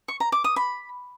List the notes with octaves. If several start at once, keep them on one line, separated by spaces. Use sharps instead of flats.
C#6
A#5
D6
D#6
B5